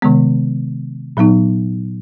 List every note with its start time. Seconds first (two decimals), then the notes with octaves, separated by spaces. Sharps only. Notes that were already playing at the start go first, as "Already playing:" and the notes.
0.02 C3 D#3 G#3 B3
1.17 A#2 F#3 B3 D#4